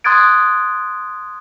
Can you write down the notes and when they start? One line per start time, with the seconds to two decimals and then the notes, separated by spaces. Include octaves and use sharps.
0.04 C6 D#6 F#6 G#6 A6 D7